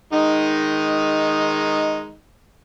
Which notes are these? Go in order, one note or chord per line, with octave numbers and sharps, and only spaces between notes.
D#3 G#3 D#4